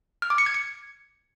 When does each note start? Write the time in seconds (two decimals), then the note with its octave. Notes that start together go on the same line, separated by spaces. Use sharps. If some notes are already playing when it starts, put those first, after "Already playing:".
0.22 F6
0.30 D6
0.38 C#7
0.46 G#6
0.54 C#7